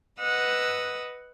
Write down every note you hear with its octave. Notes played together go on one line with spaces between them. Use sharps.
B4 D#5 F#5 D#6 E6